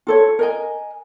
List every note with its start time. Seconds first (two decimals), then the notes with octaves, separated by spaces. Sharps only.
0.07 F4 A4 C#5
0.39 A#4 D#5 G#5